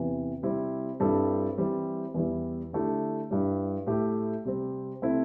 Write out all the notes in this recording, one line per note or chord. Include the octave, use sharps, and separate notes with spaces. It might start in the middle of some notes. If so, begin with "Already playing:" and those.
Already playing: E2 C3 E3
C3 G3 C4 E4
G2 G3 C4 E4 A4
E3 G3 C4 E4
E2 E3 G3 E4
D3 A3 E4 G4
G2 G3 E4
A2 A3 E4 G4
C3 G3 C4
C3 A3 C4 E4